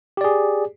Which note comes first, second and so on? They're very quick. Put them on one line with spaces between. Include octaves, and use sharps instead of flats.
G4 D5 G#4